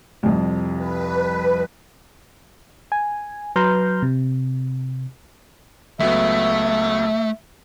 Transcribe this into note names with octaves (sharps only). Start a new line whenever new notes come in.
C2 F2
B4
G#5
F#3 B4 A#5 C6 F6 G6
C3
C#2 F#3 A3 B3 E5